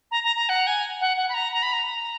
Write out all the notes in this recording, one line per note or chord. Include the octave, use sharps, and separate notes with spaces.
A#5
A#5
A#5
F#5
G#5
F#5
F#5
B5
A#5
A#5
B5
A#5